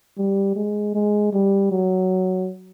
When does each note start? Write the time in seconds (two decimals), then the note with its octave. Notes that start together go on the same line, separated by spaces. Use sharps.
0.18 G3
0.55 G#3
0.94 G#3
1.33 G3
1.71 F#3